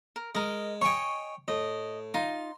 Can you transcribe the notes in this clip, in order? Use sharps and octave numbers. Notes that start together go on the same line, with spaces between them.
A#4
G#3 A#4 D#5
C#5 D#5 G5 G#5 C#6
A2 D#5
D#4 F4 C6